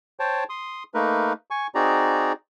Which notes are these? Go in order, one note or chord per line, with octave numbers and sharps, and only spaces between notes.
C5 C#5 G5 A5
C6 D#6
A3 A#3 D#4 A#4 B4
G#5 C#6
C4 D#4 F#4 G#4 D5 A#5